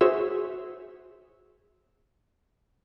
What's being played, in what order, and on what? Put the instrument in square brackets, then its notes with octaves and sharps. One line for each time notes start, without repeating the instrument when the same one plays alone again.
[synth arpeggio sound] F#4 G#4 C5 C#5 E5 E6